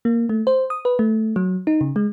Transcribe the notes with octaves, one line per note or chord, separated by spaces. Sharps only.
A#3
A3
C5
D#6
B4
A3
F#3
D#4
C#3
G#3